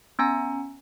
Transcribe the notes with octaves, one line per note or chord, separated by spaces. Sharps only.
B3 C#4 G#5 A#5